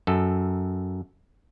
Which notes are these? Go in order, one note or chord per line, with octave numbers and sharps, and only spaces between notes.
F#2 A4